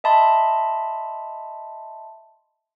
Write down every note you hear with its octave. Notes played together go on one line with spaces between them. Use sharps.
D#5 E5 A5 B5 C6